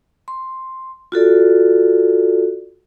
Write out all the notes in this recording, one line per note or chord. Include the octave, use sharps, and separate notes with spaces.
C6
F4 F#4 A4 D5